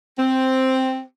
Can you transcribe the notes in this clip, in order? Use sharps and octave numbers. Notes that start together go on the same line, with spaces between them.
C4